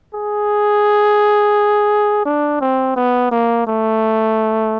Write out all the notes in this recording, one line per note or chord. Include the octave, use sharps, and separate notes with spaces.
G#4
D4
C4
B3
A#3
A3